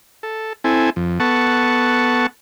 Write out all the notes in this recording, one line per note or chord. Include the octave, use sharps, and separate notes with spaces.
A4
C4 E4 A4 G#5
F2
B3 A4 F#5 A5 C#6